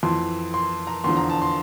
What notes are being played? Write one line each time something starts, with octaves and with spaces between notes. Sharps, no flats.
F2 E3 C6
C6
A#5
E2 D3 F3 C6
A#5
A5
C6